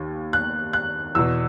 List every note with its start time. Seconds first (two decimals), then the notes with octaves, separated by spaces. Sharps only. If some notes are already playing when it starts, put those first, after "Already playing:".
Already playing: D#2 D#3
0.33 F#6
0.73 F#6
1.15 E2 B2 E6